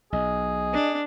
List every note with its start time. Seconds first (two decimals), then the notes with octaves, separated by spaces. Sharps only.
0.12 B1 G#4 D#5
0.74 D4